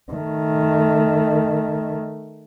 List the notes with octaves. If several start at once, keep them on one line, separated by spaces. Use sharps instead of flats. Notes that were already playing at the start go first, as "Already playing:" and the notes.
D#3 A3